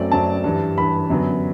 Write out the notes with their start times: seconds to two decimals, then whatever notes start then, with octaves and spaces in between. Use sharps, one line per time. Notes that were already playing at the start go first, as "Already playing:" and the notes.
Already playing: F#2 F#3 A3 C4 D5
0.11 F#2 F#3 A3 C4 A5
0.44 G2 E3 G3
0.77 G2 E3 G3 B5
1.10 F#2 D3 F#3 B3